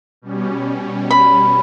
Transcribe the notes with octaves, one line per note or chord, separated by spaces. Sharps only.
B2 G3 C#4
B5